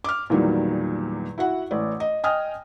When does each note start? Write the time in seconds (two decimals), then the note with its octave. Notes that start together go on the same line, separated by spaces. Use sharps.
0.04 D6 F6
0.30 E2 A#2 D#3 F#3 G3
1.38 E4 F#4 F#5
1.71 A1 D5
2.00 D#5
2.24 D#5 G5 G#5 D#6 F6